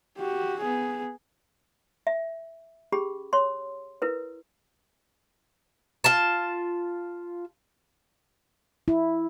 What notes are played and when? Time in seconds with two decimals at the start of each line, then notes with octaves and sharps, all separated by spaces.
0.17 F#4 G4
0.60 B3 G#4
2.07 E5
2.92 C#4 G4 G#4 B5
3.33 C#5 C6
4.02 E4 A#4 B4
6.04 F4 A5
8.88 E4